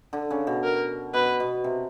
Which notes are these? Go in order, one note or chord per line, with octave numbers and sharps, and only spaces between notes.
D3
C#3
B2
A#4
B2 B4
B2
C3